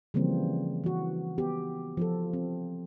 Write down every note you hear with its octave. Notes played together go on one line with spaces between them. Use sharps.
C#3 E3 F3 G3 A#3 C4
E3 F#4
B3 G4
F3 F4 A4
C4